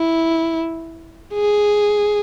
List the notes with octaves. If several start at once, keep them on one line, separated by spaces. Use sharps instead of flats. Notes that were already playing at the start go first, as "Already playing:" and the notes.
Already playing: E4
G#4